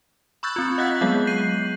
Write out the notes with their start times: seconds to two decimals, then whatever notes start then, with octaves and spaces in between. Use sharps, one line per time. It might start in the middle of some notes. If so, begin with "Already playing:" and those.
0.43 B5 C#6 E6 F#6 G6 A6
0.56 C4 F4
0.78 D#5 F5 F#5 F#6 G6 B6
1.01 F#3 G#3 B3 G#4 F5 F#6
1.27 G6 C7 D#7 F#7